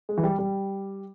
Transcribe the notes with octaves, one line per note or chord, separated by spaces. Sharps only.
G#3
E3
G3
G3